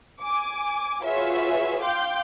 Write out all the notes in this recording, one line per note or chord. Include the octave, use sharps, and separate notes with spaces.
G#5 D6
F4 F#4 G#4 B4 C#5 E5
F5 G5 C6 D6 G6